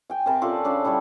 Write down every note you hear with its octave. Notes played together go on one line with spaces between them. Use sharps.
G5 G#5
C3 A#4 A5 B5
C#4 F4 A4 D5
C#3 D4 A4
D3 G3 E4 C#5